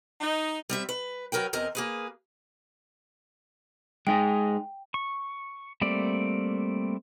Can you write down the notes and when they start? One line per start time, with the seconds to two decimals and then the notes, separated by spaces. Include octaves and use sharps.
0.21 D#4
0.70 G3 C4 E5
0.89 B4
1.32 F#3 A#4 B4 G5
1.53 E2 C4 A#4 D#5
1.75 A#3 G#4 B4
4.07 G#3 D#4 G#4 G5
4.94 C#6
5.81 G3 A3 A#3 C4 D5